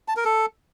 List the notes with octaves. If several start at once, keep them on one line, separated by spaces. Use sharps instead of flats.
A5
A#4
A4